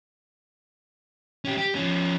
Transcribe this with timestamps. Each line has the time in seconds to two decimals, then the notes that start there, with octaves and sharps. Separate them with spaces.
1.45 C#4 G4
1.57 G4
1.75 F3 C#4